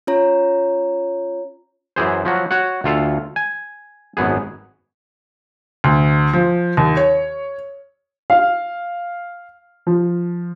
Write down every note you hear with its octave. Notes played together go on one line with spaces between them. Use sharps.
C#4 F4 C#5 A#5
F#2 E3 G#4 C5
F3 F#3 F#4
F#4 C#5 F#5
D2 F4 A4 F5
G#5
G#1 F#2 B3 G#4
D2
F3
D#2
C#5
F5
F3